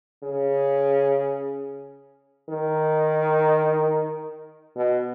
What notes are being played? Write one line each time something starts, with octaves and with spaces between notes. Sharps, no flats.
C#3
D#3
B2